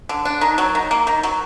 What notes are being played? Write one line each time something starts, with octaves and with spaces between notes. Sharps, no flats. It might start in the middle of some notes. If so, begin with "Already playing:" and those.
D3
D4
D#3
F#3
D#3
A#3
D#3
F#3